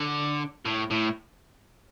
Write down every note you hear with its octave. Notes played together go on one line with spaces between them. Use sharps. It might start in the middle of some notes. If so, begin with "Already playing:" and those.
Already playing: D3
A2
A2